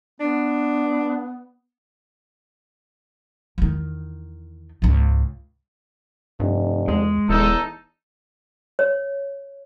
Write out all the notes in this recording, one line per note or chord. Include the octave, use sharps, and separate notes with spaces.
B3 D4
E2 D#3
C#2 G#2
F1 G2
E2 G#3
D#1 E2 D#4 A4
C#5